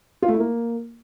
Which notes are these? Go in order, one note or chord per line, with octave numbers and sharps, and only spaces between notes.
F4
A3
E4
A#3